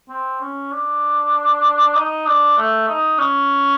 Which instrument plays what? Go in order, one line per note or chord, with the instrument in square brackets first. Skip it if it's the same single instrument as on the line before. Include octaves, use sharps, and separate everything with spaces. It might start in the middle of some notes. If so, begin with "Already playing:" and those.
[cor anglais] C4
C#4
D4
D#4
D4
A3
D#4
C#4